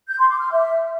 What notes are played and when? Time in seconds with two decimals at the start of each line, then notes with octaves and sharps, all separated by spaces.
0.08 G6
0.19 C6
0.30 D6
0.40 F6
0.51 E5